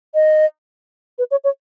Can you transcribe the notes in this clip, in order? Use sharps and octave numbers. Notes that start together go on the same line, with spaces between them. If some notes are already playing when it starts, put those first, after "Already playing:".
D#5
B4
C#5
C#5